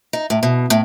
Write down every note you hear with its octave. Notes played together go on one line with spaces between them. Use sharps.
D#4
A2
B2
A2